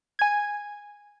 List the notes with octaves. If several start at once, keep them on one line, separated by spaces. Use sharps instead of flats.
G#5 G#6